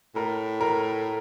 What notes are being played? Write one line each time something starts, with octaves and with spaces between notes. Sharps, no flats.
A2 A#4
A#4